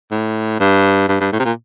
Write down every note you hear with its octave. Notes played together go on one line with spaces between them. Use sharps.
A2
G2
G2
G2
A2
C3
A#2